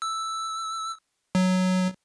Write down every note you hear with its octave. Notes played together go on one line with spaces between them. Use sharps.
E6
F#3